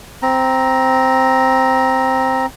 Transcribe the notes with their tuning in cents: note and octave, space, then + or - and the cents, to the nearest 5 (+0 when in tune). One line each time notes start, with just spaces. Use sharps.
C4 +0 A#5 +10